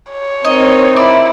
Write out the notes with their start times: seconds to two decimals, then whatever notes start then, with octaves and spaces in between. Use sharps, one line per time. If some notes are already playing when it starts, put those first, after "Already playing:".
0.11 C#5
0.45 C4 D#4 A#4 D#5
0.96 E4 D5